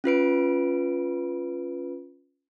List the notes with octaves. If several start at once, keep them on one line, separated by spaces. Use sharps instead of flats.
C#4 F4 B4 D7